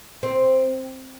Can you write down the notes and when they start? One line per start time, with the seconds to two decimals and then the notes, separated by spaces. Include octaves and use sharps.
0.23 C4